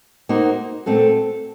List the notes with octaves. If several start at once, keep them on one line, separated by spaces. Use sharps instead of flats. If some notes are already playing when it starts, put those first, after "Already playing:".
A#3 D#4 F#4 C5
A#2 A3 C4 F#4 A4